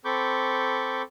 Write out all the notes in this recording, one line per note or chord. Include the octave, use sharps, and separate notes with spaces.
C4 A4 B5 C#6 D6 G6